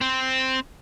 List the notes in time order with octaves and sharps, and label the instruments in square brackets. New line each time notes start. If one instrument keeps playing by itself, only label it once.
[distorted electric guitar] C4